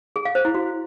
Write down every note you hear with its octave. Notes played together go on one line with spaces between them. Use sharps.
G#4
F5
C5
E4
F#4